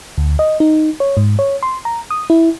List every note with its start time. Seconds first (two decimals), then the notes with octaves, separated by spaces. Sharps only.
0.18 D2
0.39 D#5
0.60 D#4
1.00 C#5
1.17 G#2
1.39 C#5
1.63 C6
1.85 A#5
2.11 D#6
2.30 E4